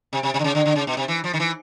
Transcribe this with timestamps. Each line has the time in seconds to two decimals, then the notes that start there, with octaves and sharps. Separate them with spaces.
0.13 C3
0.23 C3
0.34 C3
0.39 D3
0.44 C#3
0.55 D3
0.66 D3
0.76 C#3
0.87 B2
0.97 C3
1.08 E3
1.24 F3
1.34 D#3
1.40 E3